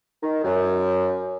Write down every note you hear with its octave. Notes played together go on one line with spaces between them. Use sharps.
D#3
F#2